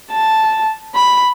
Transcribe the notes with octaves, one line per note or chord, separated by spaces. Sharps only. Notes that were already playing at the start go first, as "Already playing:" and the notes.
A5
B5